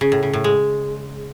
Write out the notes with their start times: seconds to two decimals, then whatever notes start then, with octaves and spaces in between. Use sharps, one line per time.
0.01 C#3
0.12 A2
0.23 C#3
0.33 A2
0.44 G#3